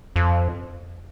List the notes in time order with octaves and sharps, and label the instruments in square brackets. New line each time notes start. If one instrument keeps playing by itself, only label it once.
[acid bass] F2